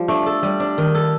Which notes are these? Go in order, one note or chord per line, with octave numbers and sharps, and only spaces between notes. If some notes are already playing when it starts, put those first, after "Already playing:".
Already playing: F3 G3
A3 D4
A4
G3
D4
D#3
A4